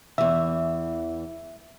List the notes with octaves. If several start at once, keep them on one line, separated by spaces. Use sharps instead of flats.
E2 E3 E5